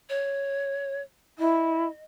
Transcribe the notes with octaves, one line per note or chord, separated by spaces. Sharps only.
C#5
E4 D#5